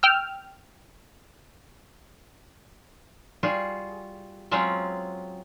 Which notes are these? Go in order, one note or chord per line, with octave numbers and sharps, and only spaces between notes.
G5 E6 F6
G3 F4 F#4 G#4
F#3 G#3 C4 C#4 F4